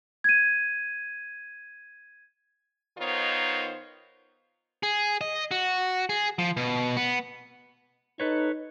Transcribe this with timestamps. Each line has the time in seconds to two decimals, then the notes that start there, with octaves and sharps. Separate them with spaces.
0.24 G#6 D#7
2.99 D#3 B3 D#4 F4 C5 C#5
4.83 G#4
5.21 D#5
5.51 F#4
6.09 G#4
6.39 F3
6.57 B2
6.97 B3
8.20 D#4 A4 B4 C#5